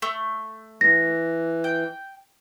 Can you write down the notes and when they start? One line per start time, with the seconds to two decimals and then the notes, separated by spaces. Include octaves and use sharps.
0.02 A3
0.81 E3 A#6
1.64 G5